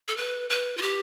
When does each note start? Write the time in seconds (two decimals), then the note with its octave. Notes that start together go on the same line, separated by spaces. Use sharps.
0.08 A4
0.17 B4
0.50 B4
0.77 F4
0.82 G4